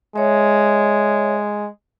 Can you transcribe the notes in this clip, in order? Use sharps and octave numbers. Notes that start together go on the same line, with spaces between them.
G#3 C#5 E5